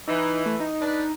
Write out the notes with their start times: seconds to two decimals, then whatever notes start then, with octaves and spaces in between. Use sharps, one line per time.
0.08 E3 D#4
0.46 A3
0.60 D#4
0.81 D4 B4